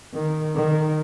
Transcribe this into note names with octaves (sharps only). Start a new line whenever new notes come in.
D#3
D#3